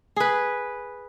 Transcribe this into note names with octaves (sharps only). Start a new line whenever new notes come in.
G#4 B4